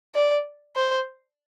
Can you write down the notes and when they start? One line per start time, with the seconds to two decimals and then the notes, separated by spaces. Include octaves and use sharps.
0.15 D5
0.76 C5